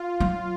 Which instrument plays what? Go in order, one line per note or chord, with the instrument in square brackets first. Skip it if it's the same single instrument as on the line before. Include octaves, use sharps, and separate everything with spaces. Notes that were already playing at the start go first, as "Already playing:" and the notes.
Already playing: [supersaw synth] F4
[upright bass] F#3